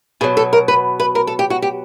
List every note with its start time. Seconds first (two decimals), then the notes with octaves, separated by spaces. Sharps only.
0.21 B2 G#4
0.24 F#3
0.37 A4
0.53 A#4
0.68 B4
1.00 B4
1.15 A#4
1.27 A4
1.39 G4
1.50 F#4
1.62 G4